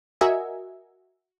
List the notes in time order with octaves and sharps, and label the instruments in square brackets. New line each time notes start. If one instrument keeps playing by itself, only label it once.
[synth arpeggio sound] F#4 A#4 D#5 E5 G#5